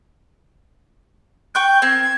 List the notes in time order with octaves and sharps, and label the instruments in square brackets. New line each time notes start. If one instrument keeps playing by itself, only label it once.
[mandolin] G5 C#6 F#6 [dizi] G6
[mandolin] C4 A#4 C6 [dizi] G#6